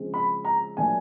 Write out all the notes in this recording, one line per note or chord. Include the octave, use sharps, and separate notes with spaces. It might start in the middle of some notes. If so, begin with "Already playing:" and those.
Already playing: C#3 F3 G#3 C4
B5
A#5
A#2 F#3 A3 D4 G#5